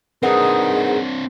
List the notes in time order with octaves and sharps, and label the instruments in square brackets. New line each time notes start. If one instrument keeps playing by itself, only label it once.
[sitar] G#2 D#4 [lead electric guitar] C4 D4 [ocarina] G#4 [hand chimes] A#4 B4 F#5